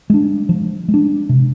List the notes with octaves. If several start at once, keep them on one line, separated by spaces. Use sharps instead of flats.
G#3 D4
F3
G#3
D4
C3